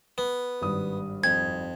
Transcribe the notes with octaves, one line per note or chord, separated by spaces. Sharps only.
B3
G#1 G2 D#6
F2 G#6